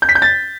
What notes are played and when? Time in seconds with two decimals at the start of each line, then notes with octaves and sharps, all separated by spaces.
0.02 G6
0.09 B6
0.15 G6
0.22 A6